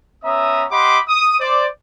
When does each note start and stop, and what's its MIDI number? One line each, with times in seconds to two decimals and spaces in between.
0.24 0.65 59
0.24 0.65 61
0.24 0.65 76
0.24 0.65 82
0.24 0.65 87
0.71 0.99 67
0.71 0.99 75
0.71 0.99 78
0.71 0.99 83
0.71 0.99 84
0.71 0.99 86
1.08 1.37 87
1.40 1.66 72
1.40 1.66 74